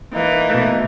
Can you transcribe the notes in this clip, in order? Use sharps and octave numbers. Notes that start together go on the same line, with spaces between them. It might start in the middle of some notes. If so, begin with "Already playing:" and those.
E3 A#3 D#4
B2 A3